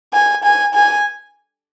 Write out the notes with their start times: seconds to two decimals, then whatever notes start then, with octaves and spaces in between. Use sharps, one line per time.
0.13 G#5
0.44 G#5
0.74 G#5